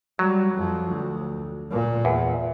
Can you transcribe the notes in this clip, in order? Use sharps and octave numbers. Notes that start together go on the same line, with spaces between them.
F#3 G3
F2 F3
D2
A#2
E2